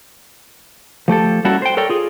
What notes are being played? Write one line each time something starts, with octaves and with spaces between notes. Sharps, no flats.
F3 A3 G4 A4
G3 A#3 C#4 E4 F#4 A4
C5 G5
A4 A#4 C#5 D5 G5
F4 G#4